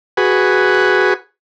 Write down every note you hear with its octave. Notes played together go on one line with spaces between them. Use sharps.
F#4 G#4 B4